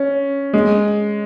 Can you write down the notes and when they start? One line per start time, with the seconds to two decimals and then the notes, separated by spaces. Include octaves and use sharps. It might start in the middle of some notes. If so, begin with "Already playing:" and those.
Already playing: C#4
0.54 G#3